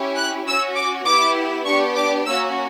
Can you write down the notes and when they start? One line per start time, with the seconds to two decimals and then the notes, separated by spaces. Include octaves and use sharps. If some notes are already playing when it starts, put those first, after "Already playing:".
Already playing: C#4 E4 G4
0.17 F#6
0.46 C#4 F#4 E6
0.76 D6
1.05 B3 E4 G4 D6
1.66 B3 D4 G4 C#6
1.96 D6
2.25 A#3 C#4 F#4 E6